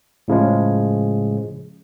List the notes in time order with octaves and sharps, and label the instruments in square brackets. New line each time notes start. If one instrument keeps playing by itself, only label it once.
[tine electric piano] A2 C#3 F3 G#3